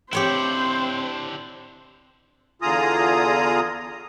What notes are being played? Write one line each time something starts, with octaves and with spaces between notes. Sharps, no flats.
C4 D4 E4 G4 C5 C#5 G5
E2 D3 F4 G#4 A#5 D#6